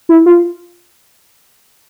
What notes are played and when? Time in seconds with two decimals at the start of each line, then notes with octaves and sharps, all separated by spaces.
0.09 E4
0.26 F4